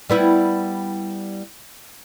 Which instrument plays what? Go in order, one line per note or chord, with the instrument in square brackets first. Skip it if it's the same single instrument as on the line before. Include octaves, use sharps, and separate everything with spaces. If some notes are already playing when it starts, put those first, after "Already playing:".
[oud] G3 B3 E4